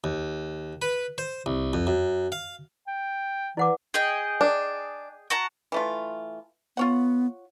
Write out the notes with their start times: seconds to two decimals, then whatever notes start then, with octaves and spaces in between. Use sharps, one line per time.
0.04 D#2
0.82 B4
1.18 C5
1.46 C2
1.73 F2
1.87 F#2
2.32 F5
2.87 G5
3.57 E3 E4 B4 D5 F#5 D6
3.94 G#4 D#5 G5
4.41 D4
5.30 F#4 A5 A#5
5.72 E3 A3 F4
6.77 B3 F4 C#5 F#5